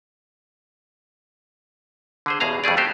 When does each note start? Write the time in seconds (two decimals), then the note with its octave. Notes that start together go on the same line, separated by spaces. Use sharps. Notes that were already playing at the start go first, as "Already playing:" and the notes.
2.26 D3 G#4 C5
2.40 A1 E2 B2 G#4 F5 A#5
2.64 F2 G3 A3 G#4 D5
2.77 A3 B3 F#4 G4 C5